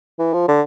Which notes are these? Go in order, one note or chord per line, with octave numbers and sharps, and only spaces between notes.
E3
F3
D3